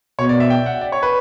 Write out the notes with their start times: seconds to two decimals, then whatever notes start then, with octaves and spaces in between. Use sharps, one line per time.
0.19 B2 C#5
0.29 D5
0.40 E5
0.50 G5
0.66 F#5
0.81 D5
0.92 C#5
1.03 B4